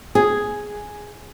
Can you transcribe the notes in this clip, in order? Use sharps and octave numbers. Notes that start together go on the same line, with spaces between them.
G#4